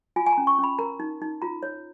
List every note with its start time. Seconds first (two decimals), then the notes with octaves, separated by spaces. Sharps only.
0.16 F4 G#5
0.26 G#5
0.33 A#5
0.38 C#4
0.47 C#6
0.59 C#4
0.64 B5
0.79 A#4 A#5
1.00 D#4
1.22 D#4
1.42 F4 A#5
1.63 C#5